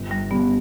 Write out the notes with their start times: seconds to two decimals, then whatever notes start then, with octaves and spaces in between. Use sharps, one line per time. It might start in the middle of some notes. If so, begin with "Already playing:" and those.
Already playing: G1
0.11 G3
0.31 G3 B3